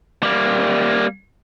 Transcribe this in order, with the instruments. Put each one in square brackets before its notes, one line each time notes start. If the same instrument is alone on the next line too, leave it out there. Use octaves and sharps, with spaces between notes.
[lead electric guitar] G3 A#3